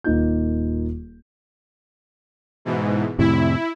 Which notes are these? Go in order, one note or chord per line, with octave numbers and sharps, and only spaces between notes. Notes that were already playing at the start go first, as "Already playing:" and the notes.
D#1 A#3 D#4 F4 G6
G#2 B2 E3
F2 A2 C3 E4